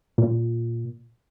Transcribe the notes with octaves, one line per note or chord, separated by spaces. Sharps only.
A#2